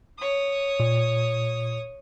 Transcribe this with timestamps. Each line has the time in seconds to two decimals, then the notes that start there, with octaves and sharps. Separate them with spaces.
0.18 C#5 D#6
0.80 A#2